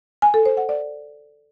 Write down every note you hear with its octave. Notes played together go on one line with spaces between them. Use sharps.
G#5
A4
C5
F#5
D5